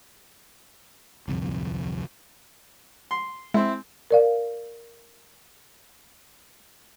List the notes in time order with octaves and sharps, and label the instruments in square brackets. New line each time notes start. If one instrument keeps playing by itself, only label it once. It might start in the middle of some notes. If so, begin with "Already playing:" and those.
[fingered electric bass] D1 C2 F2
[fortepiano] C6
[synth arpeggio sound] G#3 [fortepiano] C4 E4
[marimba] A#4 D5 F5